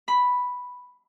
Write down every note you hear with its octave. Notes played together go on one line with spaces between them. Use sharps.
B5